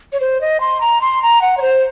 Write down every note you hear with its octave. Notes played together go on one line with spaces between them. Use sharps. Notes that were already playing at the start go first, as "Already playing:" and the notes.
C#5
C5
D#5
C6
A#5
C6
A#5
F#5
C#5
C5